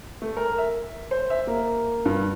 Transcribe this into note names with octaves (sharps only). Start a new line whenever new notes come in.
A3
A#4
E5
C5
E5
A#3
G2